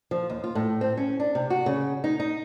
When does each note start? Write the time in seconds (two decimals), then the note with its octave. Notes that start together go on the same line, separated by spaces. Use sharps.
0.11 F3
0.30 D#2
0.44 F4
0.55 A2
0.81 C4
0.97 C#4
1.20 D4
1.35 C3
1.50 F#4
1.66 C#3
2.04 D#4
2.20 D#4